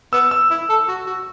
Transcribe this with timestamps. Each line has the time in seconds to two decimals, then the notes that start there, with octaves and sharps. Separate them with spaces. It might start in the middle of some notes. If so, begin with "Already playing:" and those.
0.13 B3 E6
0.31 E6
0.50 E4
0.69 A4
0.88 F#4
1.06 F#4